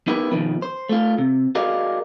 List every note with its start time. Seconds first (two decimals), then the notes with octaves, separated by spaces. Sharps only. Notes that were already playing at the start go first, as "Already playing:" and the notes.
0.07 B3 D#4 E4 G4 A#4 B4
0.31 B2 D#3 F3
0.62 C5
0.89 A3 F4
1.18 C3
1.55 F#4 G#4 A#4 D5 D#5 F5